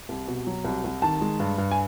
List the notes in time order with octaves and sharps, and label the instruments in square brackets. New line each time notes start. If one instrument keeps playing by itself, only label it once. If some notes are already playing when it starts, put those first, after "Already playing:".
[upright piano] C2
B2
F#3
C2
C2
D#3 A5
G#3
G2
G2
G#5